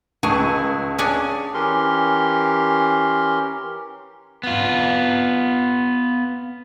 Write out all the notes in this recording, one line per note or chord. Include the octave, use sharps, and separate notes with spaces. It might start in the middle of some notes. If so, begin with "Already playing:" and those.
C#2 G#4 A5 C#6
C#4 D4 G#4
E3 C#4 G4 A#4 C6
B3 F4